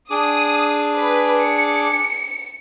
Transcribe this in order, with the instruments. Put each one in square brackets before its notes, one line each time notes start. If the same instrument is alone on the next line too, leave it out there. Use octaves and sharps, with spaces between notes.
[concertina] D4 G#4 D6 [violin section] D#6
[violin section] B4
C#7